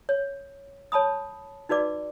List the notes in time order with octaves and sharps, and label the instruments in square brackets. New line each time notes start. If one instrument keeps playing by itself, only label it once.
[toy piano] C#5
C#5 A5 B5 D#6
D#4 F#4 B4 D5 D6